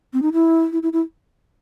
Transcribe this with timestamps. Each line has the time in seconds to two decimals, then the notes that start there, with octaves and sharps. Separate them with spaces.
0.13 C4
0.22 D#4
0.33 E4
0.72 E4
0.83 E4
0.93 E4